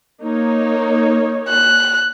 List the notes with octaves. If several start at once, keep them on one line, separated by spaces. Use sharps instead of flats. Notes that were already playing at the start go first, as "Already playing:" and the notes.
A#3 D#4 C#5
F#6